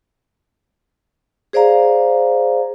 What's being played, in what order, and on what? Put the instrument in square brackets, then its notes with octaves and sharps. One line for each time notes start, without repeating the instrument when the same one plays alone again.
[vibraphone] G#4 C5 D5 F5 A#5